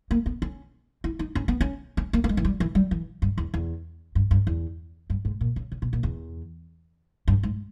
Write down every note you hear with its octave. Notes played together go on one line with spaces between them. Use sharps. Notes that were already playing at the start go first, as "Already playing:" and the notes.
A#3
B3
C#4
E4
D#4
C#4
B3
C#4
C#4
A#3
A#3
G#3
E3
G3
E3
G3
E3
G2
E2
E2
G2
G2
E2
G2
G#2
A#2
C#3
C#3
B2
A#2
E2
G2
G#2